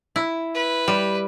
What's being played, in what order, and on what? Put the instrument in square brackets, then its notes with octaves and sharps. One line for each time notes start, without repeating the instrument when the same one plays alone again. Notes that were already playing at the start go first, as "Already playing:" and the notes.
[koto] E4
[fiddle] B4
[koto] G3